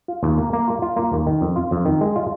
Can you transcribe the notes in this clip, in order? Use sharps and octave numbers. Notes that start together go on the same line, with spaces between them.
F4
D#2
A#3
A#3
F4
F4
A#3
D#2
D#3
F2
F4
F2
D#3
G#3
F4